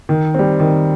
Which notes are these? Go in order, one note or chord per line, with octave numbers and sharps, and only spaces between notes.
D#3
G3 C4
D#3